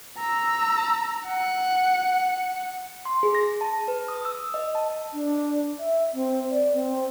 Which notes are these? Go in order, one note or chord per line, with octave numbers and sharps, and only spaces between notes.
A#5 E6
F#5
C6
G#4
A#6
A5
B4
D#6
E6
D#5
A5
D4
E5
C4
D5
C4